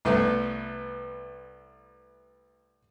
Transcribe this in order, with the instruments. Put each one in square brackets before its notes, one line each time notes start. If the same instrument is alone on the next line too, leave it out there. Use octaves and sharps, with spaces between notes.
[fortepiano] C2 A3 B3